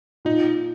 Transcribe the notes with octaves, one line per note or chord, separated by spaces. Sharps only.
A#2 D#4